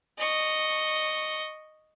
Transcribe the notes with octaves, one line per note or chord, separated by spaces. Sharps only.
D#5 C#6